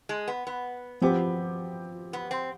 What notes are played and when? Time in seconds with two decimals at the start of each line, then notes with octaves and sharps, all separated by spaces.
0.09 G#3
0.28 B3
0.47 B3
1.02 F3 B3 C4 G4
2.13 B3
2.31 C4